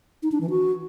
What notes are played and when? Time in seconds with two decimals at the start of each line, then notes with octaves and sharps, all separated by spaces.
0.23 D#4
0.32 D4
0.41 E3
0.50 F#4